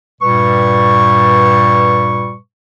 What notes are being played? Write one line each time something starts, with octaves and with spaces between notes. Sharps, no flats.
G2 A#2 G3 B4 C#6